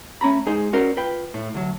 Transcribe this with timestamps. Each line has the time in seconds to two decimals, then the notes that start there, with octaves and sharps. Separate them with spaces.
0.21 A3 C#4 A#5 B5
0.46 G#3 D#4 G#4 C5
0.73 C#4 F#4 A#4 C5 D5
0.97 F4 B4 G5
1.34 A2
1.54 D2 F#3